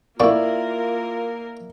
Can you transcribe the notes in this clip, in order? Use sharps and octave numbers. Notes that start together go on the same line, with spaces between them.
A#2 A#3 E4 F4 A#4 D5 C#6